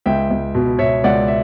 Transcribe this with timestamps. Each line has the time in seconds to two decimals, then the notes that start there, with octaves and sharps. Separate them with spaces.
0.06 C#2 E5 G5
0.31 C#2
0.55 B2
0.79 B2 C#5 E5
1.04 C#2 D5 F#5
1.28 E5